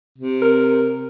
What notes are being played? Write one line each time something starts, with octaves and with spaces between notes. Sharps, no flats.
C3
A#4